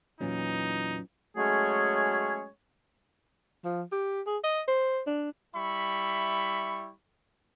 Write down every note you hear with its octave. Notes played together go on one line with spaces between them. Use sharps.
E2 A#2 E3 F#3 C#4 D#4
F#3 G#3 A3 C#4 G#4 C#5
F3
G4
G#4
D#5
C5
D4
G3 E4 E5 B5 C#6